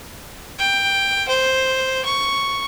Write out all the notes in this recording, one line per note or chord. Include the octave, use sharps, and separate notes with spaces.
G5
C5
C#6